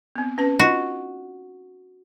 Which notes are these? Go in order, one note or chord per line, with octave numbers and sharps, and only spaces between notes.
B3 C4
C#4 B4 A5
D#4 F4 F#4 D#5